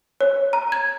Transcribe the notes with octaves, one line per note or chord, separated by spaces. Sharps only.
C#5
A#5
G#6